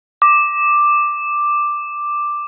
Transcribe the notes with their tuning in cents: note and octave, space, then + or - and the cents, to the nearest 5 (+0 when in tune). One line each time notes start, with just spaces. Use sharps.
D6 +5